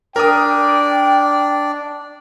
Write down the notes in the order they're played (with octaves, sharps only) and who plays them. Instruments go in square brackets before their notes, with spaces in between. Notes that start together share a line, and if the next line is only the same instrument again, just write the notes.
[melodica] D4 D5 [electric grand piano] A#4 D#6 [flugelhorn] G5